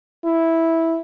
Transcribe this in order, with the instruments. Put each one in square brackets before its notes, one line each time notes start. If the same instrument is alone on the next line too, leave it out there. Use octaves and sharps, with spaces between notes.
[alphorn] E4